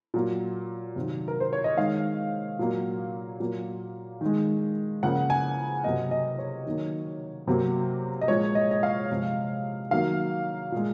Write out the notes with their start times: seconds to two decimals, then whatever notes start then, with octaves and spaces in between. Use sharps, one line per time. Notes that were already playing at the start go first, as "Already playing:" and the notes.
0.14 A#2 F#3 A#3
0.96 C3 D#3 F#3
1.28 A#4
1.40 C5
1.53 C#5
1.64 D#5
1.77 D#3 G#3 F5
2.59 A#2 F#3 A#3
3.40 A#2 F#3 A#3
4.21 D#3 G#3
5.03 C#3 F3 A#3 F#5
5.30 G#5
5.84 C3 F#3 A#3 D#5
6.11 D#5
6.39 C#5
6.66 D#3 F#3 A#3
7.47 C3 F#3 A#3
8.21 D#5
8.28 A#2 F3 G#3 C#5
8.55 D#5
8.71 D#5
8.83 F5
9.10 C3 F3 G#3
9.91 D#3 F#3 A#3 F5
10.72 A#2 G#3